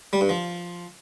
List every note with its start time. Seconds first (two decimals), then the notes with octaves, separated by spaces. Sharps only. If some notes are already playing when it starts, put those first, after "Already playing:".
0.13 G3
0.21 G2
0.29 F3